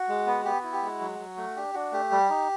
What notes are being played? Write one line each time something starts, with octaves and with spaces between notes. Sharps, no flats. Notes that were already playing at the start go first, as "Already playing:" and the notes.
Already playing: F#4
G#3
B3
B3 G4
E4 F#4
G4
G#3 F#4
F#3
F#3
A3
D4 G4
D4 F#4
A3 G4
G3
D#4